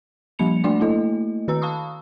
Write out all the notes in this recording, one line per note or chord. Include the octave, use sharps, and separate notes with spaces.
F3 G3 A#3 B5 C#7 F7
A3 D4 D5 F#5 C6 D6
A3 A#3 E4 A4 D#5
D#3 F#4 B4 A#5 E6
F5 A5 B5 C#6 D#6 E6